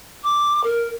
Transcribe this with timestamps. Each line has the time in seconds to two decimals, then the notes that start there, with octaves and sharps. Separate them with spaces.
0.24 D6
0.64 A#4